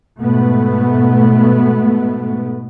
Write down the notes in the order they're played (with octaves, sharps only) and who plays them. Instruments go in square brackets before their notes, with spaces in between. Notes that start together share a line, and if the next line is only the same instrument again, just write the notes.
[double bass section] G#2 B2 A3 B3